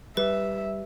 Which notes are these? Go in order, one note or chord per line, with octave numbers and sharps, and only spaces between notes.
G3 B4 E5